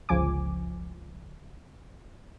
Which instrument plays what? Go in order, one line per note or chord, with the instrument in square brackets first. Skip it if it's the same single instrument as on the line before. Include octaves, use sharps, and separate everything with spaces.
[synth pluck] G1 C#2 F3 G#5 D6